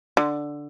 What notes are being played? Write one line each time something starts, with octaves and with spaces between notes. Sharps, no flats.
D3